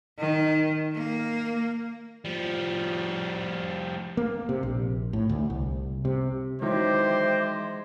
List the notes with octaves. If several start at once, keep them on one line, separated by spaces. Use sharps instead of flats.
D#3
A#3
F3 G3
A#3
C3
A#1
A2
D2
C2
C3
D#3 E3 F#3 G#3 C5 E5 G5 D6